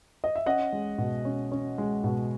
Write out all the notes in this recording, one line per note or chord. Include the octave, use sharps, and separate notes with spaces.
D#5
E5
C#4 D#5 F#5
G#3
B2
C#4
C#4
G#3
B2